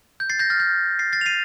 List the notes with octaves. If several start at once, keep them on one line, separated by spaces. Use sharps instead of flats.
G6
A6 C7
G6 A#6
F6 A6
G6 A#6
A6 C7
A6 C7
F7
C7 D#7